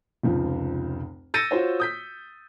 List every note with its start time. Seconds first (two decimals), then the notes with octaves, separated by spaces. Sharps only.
0.23 F1 C#2 F3
1.34 E6 G6 A6 A#6 C#7 D#7
1.51 F4 F#4 C5 C#5
1.80 D#6 G6 B6